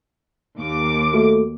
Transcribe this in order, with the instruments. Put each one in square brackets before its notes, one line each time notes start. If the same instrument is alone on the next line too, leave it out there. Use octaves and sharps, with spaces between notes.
[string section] D#2 D6
[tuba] A3 [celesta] F#4 A4